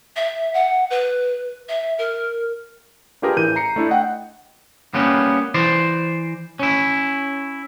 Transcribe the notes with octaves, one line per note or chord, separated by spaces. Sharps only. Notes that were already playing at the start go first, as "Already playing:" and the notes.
E5
F#5
B4
E5
A#4
D4 F4 G4 G#4 A#4 B4
A1 E3 G6 D#7
A#5 C7 C#7
A3 D4 E4
D#5 F#5 G5
G3 A#3 B3 C#4
E3 C5 D5
C#4 E4